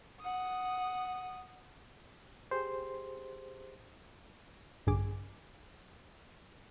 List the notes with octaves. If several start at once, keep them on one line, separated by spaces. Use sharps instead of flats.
F#5 D#6
G4 G#4 C5
A#1 G2 D3 G#4 D6